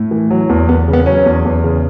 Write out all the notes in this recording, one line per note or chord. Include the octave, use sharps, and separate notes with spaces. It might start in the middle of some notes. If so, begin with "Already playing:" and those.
Already playing: A2
E3
F#3
E2
E2 B3
C#3
B3
F#3 C#4
E2
E2
C#3